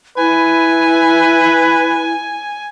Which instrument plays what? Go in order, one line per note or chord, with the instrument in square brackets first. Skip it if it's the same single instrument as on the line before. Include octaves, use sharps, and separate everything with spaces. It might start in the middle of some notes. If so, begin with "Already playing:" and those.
[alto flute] E4 [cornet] B4 [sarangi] G#5